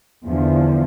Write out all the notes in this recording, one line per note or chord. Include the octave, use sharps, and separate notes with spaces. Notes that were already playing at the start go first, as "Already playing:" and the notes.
E2 D3 F3